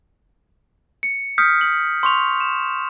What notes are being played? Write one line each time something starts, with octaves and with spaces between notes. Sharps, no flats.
C#7
D#6 F6 G6 B6 C#7
F#7
C6 C#6 F7
E7